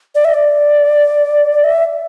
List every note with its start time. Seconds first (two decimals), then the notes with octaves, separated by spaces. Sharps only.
0.15 D5
0.25 E5
0.34 D5
1.64 E5